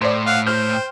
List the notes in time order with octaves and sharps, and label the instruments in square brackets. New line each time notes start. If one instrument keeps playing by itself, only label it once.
[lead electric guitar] A2 [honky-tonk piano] C5 D5
[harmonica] F5 F#5
[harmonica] C5 [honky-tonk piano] F6 G6
[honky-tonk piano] G5